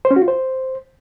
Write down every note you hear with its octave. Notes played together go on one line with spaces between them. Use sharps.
C5
C#4
F#4
F4
C5